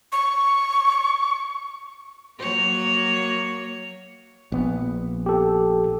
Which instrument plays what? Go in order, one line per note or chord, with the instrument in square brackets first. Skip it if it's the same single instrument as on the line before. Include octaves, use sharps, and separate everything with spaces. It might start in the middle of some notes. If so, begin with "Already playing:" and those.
[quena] C#6
[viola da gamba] F#3 A#3 C#5
[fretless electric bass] A#1 B3
[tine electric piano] G4 A4